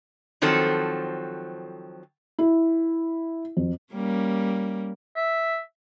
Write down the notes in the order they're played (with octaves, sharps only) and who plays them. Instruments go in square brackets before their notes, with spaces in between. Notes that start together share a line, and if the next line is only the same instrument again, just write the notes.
[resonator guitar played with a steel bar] D#3 F3 F#3 C4 A4
[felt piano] E4
F2
[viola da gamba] G3 A#3 C#4
[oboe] E5